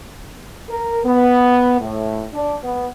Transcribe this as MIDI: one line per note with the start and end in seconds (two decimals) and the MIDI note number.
0.69 1.00 70
1.05 1.76 59
1.81 2.25 45
2.33 2.56 62
2.63 2.87 59